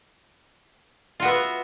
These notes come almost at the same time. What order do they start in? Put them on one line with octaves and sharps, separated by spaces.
F4 F#4 B3 E5